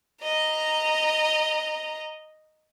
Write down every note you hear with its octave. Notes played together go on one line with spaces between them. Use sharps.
D#5 A#5